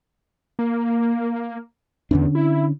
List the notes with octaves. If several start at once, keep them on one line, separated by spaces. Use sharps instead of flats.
A#3
E2 D3 C#4 D4
E4